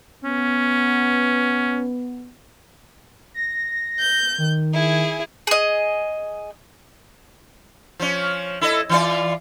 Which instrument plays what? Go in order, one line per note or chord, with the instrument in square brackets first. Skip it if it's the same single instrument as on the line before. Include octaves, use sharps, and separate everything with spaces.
[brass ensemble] B3 [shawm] C#4
[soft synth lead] A#6
[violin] G6
[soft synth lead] D#3
[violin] E4 G#4
[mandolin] G#4 D#5
[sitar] F3 C#4
E4 A4 D#5
E3 F4 D5